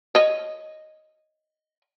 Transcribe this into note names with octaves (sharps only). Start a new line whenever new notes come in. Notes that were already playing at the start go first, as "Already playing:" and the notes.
C#5 D#5